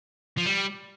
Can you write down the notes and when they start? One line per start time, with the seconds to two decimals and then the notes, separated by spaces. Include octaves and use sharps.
0.38 F3
0.46 G3